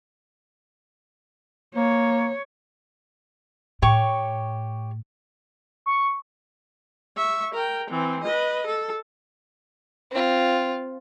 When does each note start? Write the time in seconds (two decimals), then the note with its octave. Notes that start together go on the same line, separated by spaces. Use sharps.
1.75 A#3 C#5
3.82 A2 G4 C#5 C#6
5.86 C#6
7.16 E5 C#6
7.54 A#4 G5
7.90 E3 C4
8.23 B4 D#5
8.67 A4
10.11 C4 F4